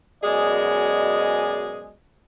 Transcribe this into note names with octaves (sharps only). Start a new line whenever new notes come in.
F#2 B2 G#3 G#4 D5 D#5